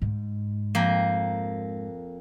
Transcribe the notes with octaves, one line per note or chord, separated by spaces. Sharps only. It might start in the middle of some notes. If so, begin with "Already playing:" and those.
G#2
F2 A#3 G5